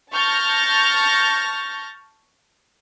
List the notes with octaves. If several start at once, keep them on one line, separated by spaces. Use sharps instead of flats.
A5 C#6 F6 G6 A6 A#6